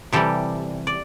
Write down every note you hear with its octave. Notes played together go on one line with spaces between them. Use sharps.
C3 E3 G3 G4 A4
D5